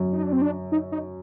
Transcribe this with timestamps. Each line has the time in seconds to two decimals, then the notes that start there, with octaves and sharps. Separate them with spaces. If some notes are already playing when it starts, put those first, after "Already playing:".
Already playing: F#2
0.13 D#4
0.23 D4
0.33 C4
0.42 D4
0.72 D#4
0.92 D#4